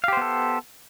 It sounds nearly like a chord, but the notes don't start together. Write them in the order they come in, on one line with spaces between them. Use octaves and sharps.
F5 G4 C5 B3 A4